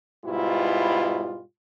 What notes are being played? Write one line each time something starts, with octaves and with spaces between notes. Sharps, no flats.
G#2 B2 G3 E4 F4